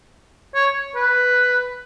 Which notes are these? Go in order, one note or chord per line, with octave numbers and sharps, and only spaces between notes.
C#5
B4